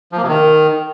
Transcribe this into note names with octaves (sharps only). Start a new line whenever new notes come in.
F3
A#3
C3
D#3